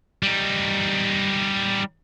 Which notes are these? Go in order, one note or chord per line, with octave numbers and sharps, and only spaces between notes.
G3 D#4